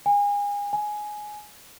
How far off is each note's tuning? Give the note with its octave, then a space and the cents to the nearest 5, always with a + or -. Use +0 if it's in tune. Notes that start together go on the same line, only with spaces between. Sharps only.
G#5 -30
G#5 +10